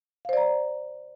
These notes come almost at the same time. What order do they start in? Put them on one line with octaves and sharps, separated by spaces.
F5 C5 D5 A#5